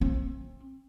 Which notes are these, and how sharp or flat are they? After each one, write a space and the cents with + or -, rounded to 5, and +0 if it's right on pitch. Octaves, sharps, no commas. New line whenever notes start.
C4 +30